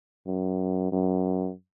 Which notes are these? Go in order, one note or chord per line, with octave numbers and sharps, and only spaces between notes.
F#2
F#2